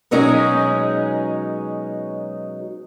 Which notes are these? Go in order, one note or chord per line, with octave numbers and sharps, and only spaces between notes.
B2 F#3 G#3 C#4 D#4 G#4